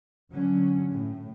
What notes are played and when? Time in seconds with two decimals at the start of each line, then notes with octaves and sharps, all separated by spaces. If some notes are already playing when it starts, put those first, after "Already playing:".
0.32 D3 F#3 C#4
0.93 A2